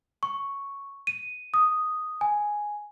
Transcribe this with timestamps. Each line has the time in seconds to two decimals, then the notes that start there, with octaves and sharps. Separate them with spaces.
0.23 C#6
1.07 D#7
1.54 D#6
2.21 G#5